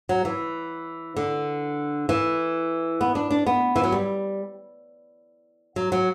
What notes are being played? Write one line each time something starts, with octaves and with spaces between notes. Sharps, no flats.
F#3
E3
D3
E3
B3
D4
D4
B3
E3
F#3
G3
F#3
F#3